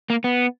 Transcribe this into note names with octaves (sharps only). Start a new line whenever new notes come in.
A#3
B3